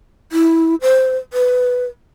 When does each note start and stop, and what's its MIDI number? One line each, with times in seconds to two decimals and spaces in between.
0.32 0.75 64
0.81 1.16 72
1.33 1.85 71